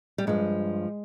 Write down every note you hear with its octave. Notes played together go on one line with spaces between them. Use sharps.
G3
G2 F3 G#3